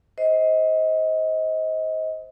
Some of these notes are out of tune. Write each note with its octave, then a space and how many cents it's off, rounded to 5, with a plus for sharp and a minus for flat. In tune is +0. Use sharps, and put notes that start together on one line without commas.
C5 +0 D#5 +30